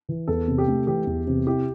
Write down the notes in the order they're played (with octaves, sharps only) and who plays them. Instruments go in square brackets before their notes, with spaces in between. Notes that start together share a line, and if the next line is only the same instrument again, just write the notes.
[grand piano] E3
[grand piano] E2 [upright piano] A4
[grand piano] C3
[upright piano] G4
[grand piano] A3
[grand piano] E3 [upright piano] G4
[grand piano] E2
C3
[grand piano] E4 [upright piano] G4